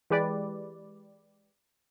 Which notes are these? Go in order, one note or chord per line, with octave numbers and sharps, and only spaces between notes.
E3 G#3 G4 B4 D5